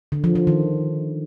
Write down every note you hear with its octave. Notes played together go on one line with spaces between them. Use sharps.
D3
F3
F3
D#3